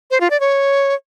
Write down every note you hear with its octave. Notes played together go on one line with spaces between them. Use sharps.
C5
F4
D5
C#5